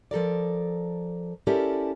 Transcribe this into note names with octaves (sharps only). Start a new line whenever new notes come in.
F3 A4 A#4 D5
C#4 E4 G4 A4 A#4 D5